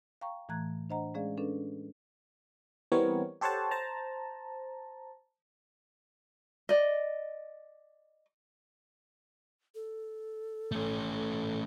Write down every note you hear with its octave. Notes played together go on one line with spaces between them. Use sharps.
F5 G5 A#5 C#6
A2 E3 A3 A#5 F#6 G#6
D4 C5 D#5 F#5 A#5
G#3 C#4 G#4 D5 F5
C#4 D4 A4 B4
E3 G3 B3 C4 A#4 C#5
G4 A4 C5 C#5 F#5 A5
C5 A5 A#5
D5 D#5
A4
A3 C#4